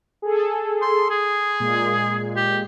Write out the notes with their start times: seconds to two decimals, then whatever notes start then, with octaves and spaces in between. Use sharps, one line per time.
0.22 G#4 A4
0.82 C6
1.10 G#4
1.60 A#2 G#3
2.36 G4